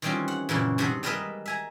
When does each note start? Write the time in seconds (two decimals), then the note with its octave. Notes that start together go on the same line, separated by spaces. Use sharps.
0.02 D#3 E3 G3 C4 C#4 F4
0.28 F#5
0.49 F#2 A#2 C#3 E3
0.78 G2 C3 D#3 C5 F#5
1.03 G3 G#3 A#4 B4 D#5 E5
1.46 E5 G#5 A#5